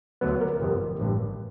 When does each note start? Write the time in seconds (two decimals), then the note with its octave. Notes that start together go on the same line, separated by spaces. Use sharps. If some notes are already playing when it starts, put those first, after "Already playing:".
0.21 D2 D3 F#3 B3 B4
0.41 A#4
0.60 G1 F2 C3 A#4
1.00 A1 G2 D3